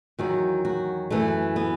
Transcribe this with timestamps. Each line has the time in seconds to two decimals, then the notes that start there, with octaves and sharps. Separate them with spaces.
0.19 E2 D#3 F#3 F#4
0.65 F#4
1.10 F#2 E3 A3
1.56 B3